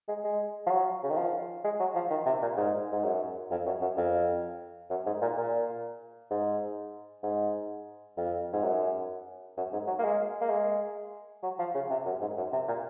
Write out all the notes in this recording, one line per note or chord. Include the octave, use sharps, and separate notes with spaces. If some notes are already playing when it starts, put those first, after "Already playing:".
G#3
G#3
F3
F#3
C#3
D#3
F3
G#3
F#3
F3
D#3
C3
A#2
G#2
G#2
F#2
F2
F#2
F#2
F2
F#2
G#2
A#2
A#2
G#2
G#2
F2
G#2
F#2
F#2
G#2
F#3
A#3
G#3
A#3
G#3
F#3
F3
C#3
C3
F#2
G#2
F#2
C3
A#2